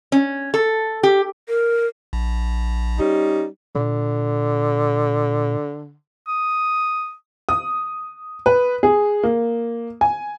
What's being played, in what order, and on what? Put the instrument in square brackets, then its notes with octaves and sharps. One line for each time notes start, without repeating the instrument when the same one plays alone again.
[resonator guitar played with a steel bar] C#4
A4
G4
[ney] A#4
[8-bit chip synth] A#1
[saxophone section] G3 C#4 D#4
[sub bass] A#2 [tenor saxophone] D3
[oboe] D#6
[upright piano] D#6
B4
G#4
A#3
G#5